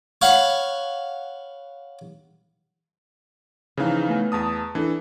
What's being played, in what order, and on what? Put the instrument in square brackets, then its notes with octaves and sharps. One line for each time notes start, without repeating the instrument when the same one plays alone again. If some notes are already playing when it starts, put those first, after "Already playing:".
[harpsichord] C#5 F5 F#5 B5 C#6
[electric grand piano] C#3 E3 F5 [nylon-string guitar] F3 D#4
[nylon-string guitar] A3 B3 G#5
[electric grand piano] E2 A5 D#6
[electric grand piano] E3 [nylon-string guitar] D4 A4